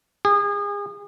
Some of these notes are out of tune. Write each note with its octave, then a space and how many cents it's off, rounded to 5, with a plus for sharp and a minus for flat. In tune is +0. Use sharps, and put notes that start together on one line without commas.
G#4 -35